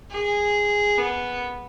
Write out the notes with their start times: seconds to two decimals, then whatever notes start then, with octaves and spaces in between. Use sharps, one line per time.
0.11 G#4
0.98 B3